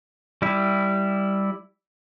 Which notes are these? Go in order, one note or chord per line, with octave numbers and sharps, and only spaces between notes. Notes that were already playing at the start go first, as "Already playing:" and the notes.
G3 E4